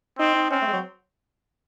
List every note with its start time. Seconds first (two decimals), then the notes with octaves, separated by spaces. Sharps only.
0.19 C4 D#4
0.35 D#4
0.50 C4 C#4
0.62 A3
0.68 G#3
0.73 F#3